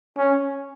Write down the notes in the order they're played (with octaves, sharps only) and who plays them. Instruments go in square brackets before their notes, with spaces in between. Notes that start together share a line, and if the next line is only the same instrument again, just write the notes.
[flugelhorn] C#4